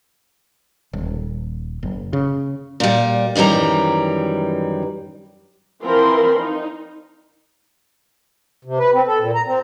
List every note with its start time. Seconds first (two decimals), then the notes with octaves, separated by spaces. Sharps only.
0.93 D#1
1.83 F#1
2.13 C#3
2.80 A#2 G3
3.35 F#2 D#3 E3 G3 A#5
5.83 E3 F3 C4 A#4 B5 C6
6.39 D#4
8.65 C3
8.79 B4
8.94 C4
9.07 A4
9.19 A#2
9.35 A#5
9.46 C4